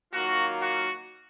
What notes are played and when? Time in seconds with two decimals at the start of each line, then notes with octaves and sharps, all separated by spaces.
0.13 D#3 F#3 A#3 F4 F#4
0.60 F#4